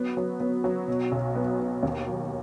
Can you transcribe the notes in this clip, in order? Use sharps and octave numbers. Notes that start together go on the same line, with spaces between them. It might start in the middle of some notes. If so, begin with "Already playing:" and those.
Already playing: F#3 B3
F#3
B3
F#3
B2
B1
B3
B3
D#2
F#3